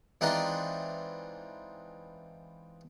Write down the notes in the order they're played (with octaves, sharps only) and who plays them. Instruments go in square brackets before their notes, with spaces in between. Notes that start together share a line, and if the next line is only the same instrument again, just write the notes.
[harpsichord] E3 G#3 C4 D4 D#4 F4